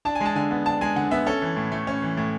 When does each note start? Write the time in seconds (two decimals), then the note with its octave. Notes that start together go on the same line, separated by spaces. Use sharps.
0.05 D4 A5
0.15 G#5
0.21 G#3 A5
0.35 D3 G#5
0.51 B3
0.66 D4 A5
0.81 G#3 G#5
0.96 D3 F#5
1.11 B3 E5
1.26 C#4 A4
1.42 E3
1.57 A2
1.72 A3
1.87 C#4
2.02 E3
2.17 A2